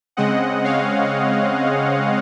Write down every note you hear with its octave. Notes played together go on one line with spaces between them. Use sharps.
C#3 G#3 C4 D#5 F#5
C#5 F5